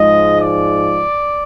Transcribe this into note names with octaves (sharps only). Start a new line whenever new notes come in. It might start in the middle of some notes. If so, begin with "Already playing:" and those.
Already playing: G#2 F3 G#3 D#5
D5